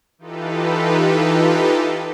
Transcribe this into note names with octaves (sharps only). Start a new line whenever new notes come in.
E3 D#4 F4 G4 A4 B4